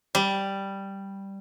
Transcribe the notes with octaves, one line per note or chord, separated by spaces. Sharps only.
G3